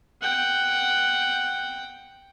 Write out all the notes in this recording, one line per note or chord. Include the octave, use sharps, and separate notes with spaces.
F#5 G5